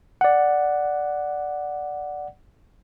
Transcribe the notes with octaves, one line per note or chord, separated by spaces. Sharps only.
D5 F#5